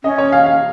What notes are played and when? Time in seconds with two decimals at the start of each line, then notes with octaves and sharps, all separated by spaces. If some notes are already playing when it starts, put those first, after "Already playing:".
0.04 C#4 D#5
0.18 C#5
0.32 F5
0.46 F5